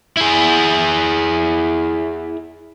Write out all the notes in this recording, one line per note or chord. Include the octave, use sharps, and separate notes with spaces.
E4 G#4